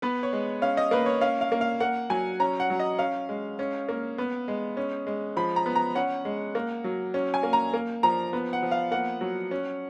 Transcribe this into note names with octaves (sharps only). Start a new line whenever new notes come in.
B3 B4
C#5
G#3
C#4 F5
D#5
A#3 B4
C#5
C#4 F5
F5
A#3
F5
A#3 F#5
F#3 G#5
C#4 A#5
F#5
F#3
D#5
C#4 F5
G#3
C#4
A#3
B3
G#3
C#4
G#3
F3 B5
A#5
B3
A#5
C#4 F#5
G#3
A#3
F#3
C#4
G#5
A#3
A#5
A#3
F3 A#5
B3
F#5
F3
F5
A#3 F#5
F#3
C#4